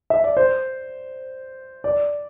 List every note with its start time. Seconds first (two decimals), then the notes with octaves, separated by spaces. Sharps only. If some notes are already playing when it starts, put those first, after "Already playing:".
0.10 E5
0.24 D5
0.37 C5
1.84 D5